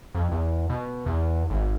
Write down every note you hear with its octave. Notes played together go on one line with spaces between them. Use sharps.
F2
E2
B2
E2
G#1